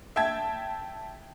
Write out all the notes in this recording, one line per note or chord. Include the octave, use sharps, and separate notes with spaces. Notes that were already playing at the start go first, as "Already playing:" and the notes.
E5 G5 A5 G#6